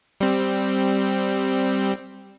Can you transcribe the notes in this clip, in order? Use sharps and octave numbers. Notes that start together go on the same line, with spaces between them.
G3 C4